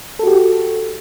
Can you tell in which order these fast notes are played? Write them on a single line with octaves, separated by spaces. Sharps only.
A4 F#4 G4